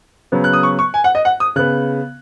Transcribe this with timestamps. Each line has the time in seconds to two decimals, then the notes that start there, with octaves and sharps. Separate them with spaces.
0.32 C#3 F#3 B3
0.44 F#6
0.53 D#6
0.63 C#6
0.79 C#6
0.94 G#5
1.04 F#5
1.15 D#5
1.25 F#5
1.40 D#6
1.56 C#3 F#6
1.59 B3